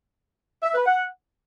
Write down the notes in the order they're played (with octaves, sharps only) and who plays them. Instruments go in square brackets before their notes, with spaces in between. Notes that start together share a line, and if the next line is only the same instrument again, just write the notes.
[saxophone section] E5
B4
F#5